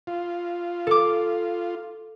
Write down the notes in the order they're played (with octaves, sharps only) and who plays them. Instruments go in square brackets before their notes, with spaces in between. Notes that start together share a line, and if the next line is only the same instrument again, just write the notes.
[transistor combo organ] F4
[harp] A4 D6